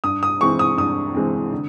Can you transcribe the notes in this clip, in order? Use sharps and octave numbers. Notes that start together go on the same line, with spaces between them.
G2 D#6
D#6
E3 G#3 C4 C#6
D#6
G2 D#6
E3 G#3 C4
D3